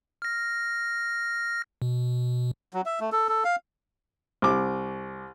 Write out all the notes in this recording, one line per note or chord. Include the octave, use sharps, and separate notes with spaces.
F6 A#6
B2
F#3
E5
A3
A4
A4
F5
C2 D6